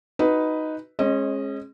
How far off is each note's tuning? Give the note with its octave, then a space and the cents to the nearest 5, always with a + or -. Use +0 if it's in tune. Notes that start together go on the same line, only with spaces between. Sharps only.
D#4 +5 F#4 +0 B4 +0
G#3 +10 C#4 -30 D#5 -5